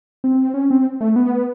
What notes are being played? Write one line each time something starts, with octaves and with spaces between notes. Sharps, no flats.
C4
C#4
C4
A3
B3